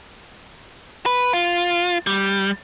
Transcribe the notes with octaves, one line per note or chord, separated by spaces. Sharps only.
B4
F4
G3